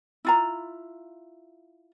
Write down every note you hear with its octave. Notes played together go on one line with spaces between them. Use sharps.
E4 F4 A#5